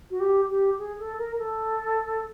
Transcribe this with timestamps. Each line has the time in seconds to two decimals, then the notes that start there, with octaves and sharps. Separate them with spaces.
0.10 F#4
0.20 G4
0.49 G4
0.78 G#4
0.99 A4
1.18 A#4
1.38 A4